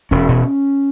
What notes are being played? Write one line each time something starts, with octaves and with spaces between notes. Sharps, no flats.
E1 C#4
B2